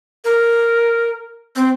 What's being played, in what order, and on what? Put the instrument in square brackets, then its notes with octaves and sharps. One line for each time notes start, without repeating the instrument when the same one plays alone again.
[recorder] A#4
C4